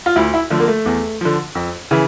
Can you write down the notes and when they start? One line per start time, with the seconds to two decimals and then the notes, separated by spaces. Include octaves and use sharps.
0.06 F4
0.16 D2 E4
0.34 E4
0.50 D3 F3 A3
0.60 A#3
0.68 A3
0.86 E2
1.21 D3 F3
1.55 F2
1.91 C#3 E3